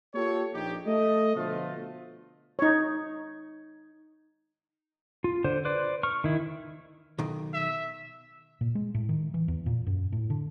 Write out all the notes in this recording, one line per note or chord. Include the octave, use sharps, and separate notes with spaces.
A#3 F4 G4 A4 C#5
A#1 D#4 G4
A3 D#5
B2 D3 F3 A3 F4
D#4 C#5
F4
D3 C5
B4 C5 D5
C#6 F6
D#3 E4
B1 D#3
E5
A#2
G#3
A2
D#3
E3
E2
A#2
F#2
A2
D3